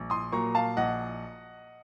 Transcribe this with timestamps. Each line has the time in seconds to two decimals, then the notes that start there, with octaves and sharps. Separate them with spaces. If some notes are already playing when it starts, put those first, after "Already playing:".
Already playing: A#1
0.10 C6 D#6
0.32 A#2 F#3 A#3 A#5 C#6
0.55 F5 A5
0.77 A#1 D#5 F#5